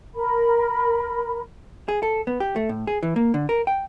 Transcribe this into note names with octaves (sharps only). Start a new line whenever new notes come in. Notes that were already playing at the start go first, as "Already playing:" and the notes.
A#4 B5
G#4
A4
B3
G4
A3
A2
G#4
E3
A#3
D3
A#4
G5